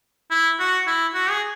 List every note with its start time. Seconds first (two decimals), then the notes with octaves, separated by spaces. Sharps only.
0.31 E4
0.60 F#4
0.87 E4
1.14 F#4
1.30 G#4